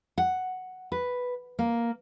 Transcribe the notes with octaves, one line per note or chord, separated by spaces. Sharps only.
F#5
B4
A#3